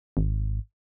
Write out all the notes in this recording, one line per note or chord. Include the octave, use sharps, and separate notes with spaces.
G#1